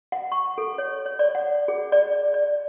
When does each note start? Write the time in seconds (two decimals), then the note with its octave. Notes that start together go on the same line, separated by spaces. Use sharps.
0.12 F#5
0.32 C#6
0.58 A4
0.78 C#5
1.06 C#5
1.19 D5
1.35 F#5
1.68 G#4
1.92 D5
2.34 D5